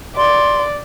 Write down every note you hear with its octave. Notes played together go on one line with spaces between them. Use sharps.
D5 C6